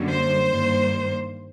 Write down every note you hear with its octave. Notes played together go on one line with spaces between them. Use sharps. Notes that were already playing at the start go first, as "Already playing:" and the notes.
Already playing: F#2 D3 G3 A#3
C5
G2 D#3 G3 A#3